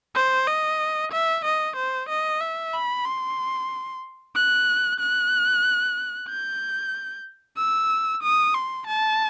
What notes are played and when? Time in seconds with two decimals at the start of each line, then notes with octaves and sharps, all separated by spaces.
0.15 C5
0.47 D#5
1.12 E5
1.45 D#5
1.76 C5
2.09 D#5
2.41 E5
2.73 B5
3.05 C6
4.35 F#6
4.99 F#6
6.28 G6
7.57 E6
8.23 D#6
8.54 C6
8.87 A5